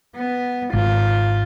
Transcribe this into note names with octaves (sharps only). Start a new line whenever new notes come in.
B3
G#1 F4